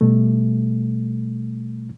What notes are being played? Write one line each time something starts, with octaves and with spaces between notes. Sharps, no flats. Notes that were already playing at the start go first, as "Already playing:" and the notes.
B2 G3 A3